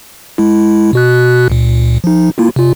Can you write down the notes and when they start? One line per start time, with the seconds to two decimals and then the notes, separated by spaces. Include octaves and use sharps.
0.38 G#3 E4
0.93 B2 F#4 F#6
1.50 C#2 A#2
2.04 F3 D#4
2.38 A#3 E4 F4
2.56 C3 F4